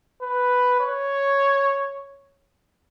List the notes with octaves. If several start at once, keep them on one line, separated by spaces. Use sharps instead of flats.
B4
C#5